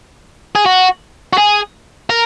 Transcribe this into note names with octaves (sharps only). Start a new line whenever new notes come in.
G#4
F#4
F#4
G#4
A#4